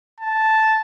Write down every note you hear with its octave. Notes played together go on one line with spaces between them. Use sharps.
A5